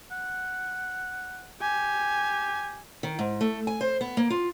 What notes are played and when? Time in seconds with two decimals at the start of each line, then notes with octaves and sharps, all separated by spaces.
0.11 F#5
1.61 G4 G#5
3.03 D#3
3.19 G#2
3.41 A3
3.67 G#5
3.81 C5
4.01 B3
4.17 A#3
4.30 F4